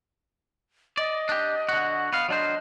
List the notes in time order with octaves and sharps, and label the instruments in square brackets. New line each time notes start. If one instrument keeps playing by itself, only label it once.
[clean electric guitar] D5 [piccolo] D#5
[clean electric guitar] D4 G4
D3 F#4
B3 F5
[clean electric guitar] F#3 D4 C5 [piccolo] D#5